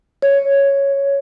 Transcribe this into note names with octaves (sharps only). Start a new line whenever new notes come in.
C#5